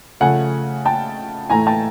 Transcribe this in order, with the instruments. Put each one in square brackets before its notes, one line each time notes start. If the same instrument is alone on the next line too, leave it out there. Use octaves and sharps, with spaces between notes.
[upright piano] C#3 F3 A3 F#5 G#5
G5 A5
A2 E3 A3 G#5 A#5
G5 A5